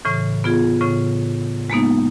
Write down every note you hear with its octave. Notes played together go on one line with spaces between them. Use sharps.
A2 C#3 E3
B3 F4 G#4
A2 C#3
G#3 A#3 B3 D#4